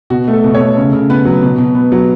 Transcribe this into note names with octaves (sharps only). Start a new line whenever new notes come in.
B2 F#4
A3
A4
B2
C#5
A3
C#3
C#3
B3 B4
F#3
B2
B2
B3
F#3